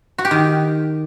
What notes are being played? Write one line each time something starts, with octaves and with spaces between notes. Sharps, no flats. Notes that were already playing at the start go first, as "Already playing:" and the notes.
F#4
G4
D#3